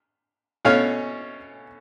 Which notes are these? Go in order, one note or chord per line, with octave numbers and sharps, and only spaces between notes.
B2 A3 C#4 C#5 F5